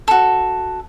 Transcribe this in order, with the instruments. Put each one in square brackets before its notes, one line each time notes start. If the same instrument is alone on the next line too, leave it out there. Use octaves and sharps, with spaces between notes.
[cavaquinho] F#4 A4